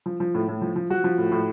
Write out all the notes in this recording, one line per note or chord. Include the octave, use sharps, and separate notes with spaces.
F3
F3
A2
A2
F3
F3
F3 F#4
F3
A2
A2